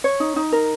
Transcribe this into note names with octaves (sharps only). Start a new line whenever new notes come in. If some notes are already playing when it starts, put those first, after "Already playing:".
C#5
D#4
D#4
A#4